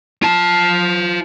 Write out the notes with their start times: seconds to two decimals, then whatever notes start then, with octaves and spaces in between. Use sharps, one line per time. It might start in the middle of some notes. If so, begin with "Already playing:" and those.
0.23 F4 A5